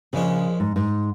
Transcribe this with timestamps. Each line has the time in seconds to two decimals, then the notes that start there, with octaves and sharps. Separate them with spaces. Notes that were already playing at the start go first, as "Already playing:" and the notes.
0.13 A#1 A#2 C#3 G#3 C#4
0.60 G#2
0.76 G#2